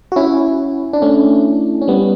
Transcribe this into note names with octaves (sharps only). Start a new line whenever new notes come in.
F#4
C#4 E4
D4
A3 C#4
C#4
G3 B3